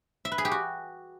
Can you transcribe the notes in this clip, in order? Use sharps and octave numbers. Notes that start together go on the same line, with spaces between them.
E5
B4
G#4
G4
F#4